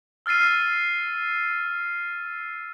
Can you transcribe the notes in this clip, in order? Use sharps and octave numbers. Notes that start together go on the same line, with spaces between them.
E6 F6 A6 C7 D#7